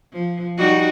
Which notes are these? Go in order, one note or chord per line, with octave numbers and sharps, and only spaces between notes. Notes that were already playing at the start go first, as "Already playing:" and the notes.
F3
G3 D#4 F#4